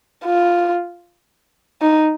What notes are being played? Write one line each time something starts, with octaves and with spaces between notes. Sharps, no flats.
F4
D#4